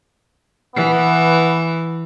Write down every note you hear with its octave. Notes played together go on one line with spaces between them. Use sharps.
E3 B3